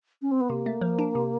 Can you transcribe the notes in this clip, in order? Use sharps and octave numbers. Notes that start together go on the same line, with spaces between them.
C#4
C4
B3
C3 A#3
A3
F3
D4
C3